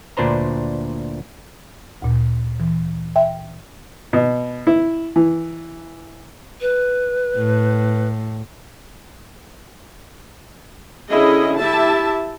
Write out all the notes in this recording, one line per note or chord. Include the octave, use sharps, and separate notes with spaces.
D2 A#2 D4 B4 C5 A#5
D2 A#2
E3
E5 G5
B2
E4
E3
B4
A2
D3 C#4 E4 G#4 D#5
E4 G4 E5 A5